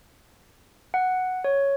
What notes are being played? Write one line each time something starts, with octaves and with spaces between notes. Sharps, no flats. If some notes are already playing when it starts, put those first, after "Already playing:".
F#5
C#5